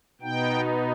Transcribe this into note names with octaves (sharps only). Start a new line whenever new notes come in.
B2 B3 D#4 G5